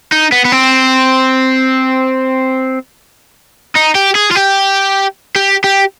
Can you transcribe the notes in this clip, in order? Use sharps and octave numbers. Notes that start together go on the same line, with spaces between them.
D#4
B3
B3
C4
D#4
G4
G#4
F4
G4
G4
G4